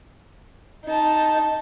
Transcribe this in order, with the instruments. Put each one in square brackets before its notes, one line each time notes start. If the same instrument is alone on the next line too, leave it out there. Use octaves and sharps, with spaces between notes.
[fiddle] D#4 A5